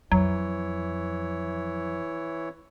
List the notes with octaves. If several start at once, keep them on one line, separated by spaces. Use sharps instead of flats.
F2 E3 F#3 E4 C#5